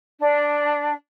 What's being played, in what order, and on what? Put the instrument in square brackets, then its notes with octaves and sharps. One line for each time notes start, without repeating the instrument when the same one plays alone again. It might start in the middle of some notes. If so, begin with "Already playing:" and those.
[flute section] D4